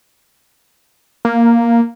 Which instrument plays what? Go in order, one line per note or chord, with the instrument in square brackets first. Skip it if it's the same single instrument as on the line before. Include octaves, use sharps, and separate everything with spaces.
[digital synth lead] A#3